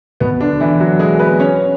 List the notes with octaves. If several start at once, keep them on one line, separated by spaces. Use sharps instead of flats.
B2 B3
D3 D4
E3 E4
F#3 F#4
G#3 G#4
B3 B4
C#4 C#5